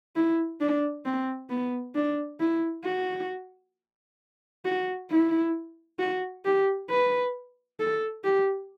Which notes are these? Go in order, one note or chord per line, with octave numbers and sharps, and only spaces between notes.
E4
D4
C4
B3
D4
E4
F#4
F#4
E4
F#4
G4
B4
A4
G4